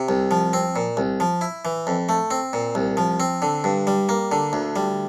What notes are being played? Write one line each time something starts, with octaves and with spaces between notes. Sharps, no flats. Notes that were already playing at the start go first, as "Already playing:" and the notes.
Already playing: C3
C2
F3
C4
A#2
C2
F3
E4
E3
F2
A3
C4
A#2
C2
F3
C4
D3
G2
G3
A#3
D3
D2
G3